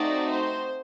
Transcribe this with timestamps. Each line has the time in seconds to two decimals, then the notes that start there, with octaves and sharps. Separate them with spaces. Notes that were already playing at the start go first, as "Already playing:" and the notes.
Already playing: A3 C4 D#4 F#4 D5
0.31 C5